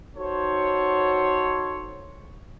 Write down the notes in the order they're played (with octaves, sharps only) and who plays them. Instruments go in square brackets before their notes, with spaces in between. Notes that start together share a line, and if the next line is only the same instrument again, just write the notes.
[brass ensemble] D#4 F#4 A4 C5 C#5